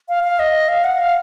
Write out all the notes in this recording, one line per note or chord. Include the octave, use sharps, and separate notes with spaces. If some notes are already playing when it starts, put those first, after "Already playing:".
F5
F5
D#5
F5
F#5
F5